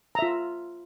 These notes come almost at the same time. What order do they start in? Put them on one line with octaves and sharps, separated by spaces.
A#5 E5 F4